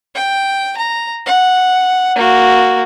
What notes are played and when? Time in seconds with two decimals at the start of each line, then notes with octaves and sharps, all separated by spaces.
0.15 G5
0.77 A#5
1.26 F#5
2.16 A#3 F#4